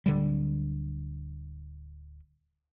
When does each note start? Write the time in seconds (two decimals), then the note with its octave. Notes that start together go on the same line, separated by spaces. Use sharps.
0.06 D1 D3 G3